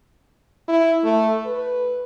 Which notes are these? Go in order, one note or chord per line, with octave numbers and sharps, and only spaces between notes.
E4
A3
B4